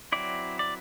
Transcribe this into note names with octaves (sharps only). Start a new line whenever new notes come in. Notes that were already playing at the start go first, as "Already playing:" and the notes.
F#3 C4 E4 D5
D5